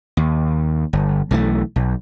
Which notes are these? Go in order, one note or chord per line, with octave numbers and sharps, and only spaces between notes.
D#2
G1
B1 E3 F#3 A3
B1